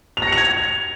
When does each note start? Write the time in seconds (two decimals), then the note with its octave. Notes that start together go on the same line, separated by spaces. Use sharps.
0.17 F7
0.22 A#6
0.27 C#7
0.32 F7
0.37 G#6